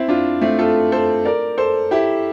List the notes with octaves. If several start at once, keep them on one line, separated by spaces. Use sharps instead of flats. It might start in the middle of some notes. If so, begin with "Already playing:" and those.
Already playing: C4 E4
D4 F4
A3 C4
F4 A4
A4 C5
A#4 D5
A4 C5
E4 G4